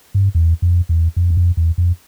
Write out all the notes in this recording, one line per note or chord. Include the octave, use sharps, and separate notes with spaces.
G2
E2
F2
E2
F2
E2
F2
E2
F2